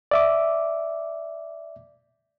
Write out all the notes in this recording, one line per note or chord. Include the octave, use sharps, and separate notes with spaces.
D5 E5 D6